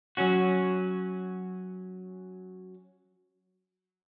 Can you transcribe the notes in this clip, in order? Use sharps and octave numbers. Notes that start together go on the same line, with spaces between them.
F#3 C#4 F#4